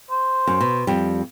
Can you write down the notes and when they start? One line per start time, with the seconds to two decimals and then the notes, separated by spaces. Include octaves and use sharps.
0.11 C5
0.47 F#2
0.61 B2
0.87 F2 G3